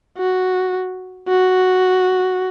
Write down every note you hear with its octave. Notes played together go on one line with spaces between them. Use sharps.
F#4
F#4